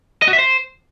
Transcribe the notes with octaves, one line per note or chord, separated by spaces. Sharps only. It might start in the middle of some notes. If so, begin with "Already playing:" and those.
D#5
F#4
E5
C5